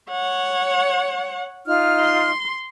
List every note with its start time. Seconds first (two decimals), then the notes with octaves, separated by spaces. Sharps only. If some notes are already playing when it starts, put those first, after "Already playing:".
0.11 C#5 F#5
1.66 D#4 F4 F6
2.00 C6